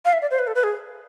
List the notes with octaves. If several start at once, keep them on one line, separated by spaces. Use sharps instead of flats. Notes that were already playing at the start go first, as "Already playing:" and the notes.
F5
E5
D5
C5
B4
A4
B4
G#4